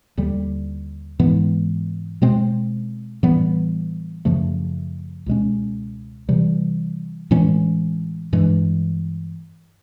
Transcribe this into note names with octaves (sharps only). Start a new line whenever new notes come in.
D#2 D3 G3
G#2 E3 G#3 B3
B2 G#3 C4
A2 E3 G3 B3
F#2 C#3 F3 A3
C#2 B2 G#3 C#4
C3 E3 G3
A2 E3 G#3 C#4
G2 E3 G#3